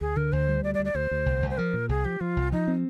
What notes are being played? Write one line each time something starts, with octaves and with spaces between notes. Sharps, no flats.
D2 G#4
D3 A#4
D2 C5
G3
D2 D5
D5
D2
D5
D2 C5
D2
C2
C2
C5
F3 A#4
A#2
C2 G#4
F3 G4
F3 F4
C2
F3 D#4
C4